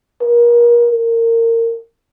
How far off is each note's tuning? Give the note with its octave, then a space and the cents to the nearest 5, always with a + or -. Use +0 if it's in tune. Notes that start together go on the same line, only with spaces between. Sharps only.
A#4 +30
A#4 -25